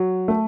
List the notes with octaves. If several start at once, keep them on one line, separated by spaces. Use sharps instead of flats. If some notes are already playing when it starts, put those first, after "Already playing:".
Already playing: F#3
A3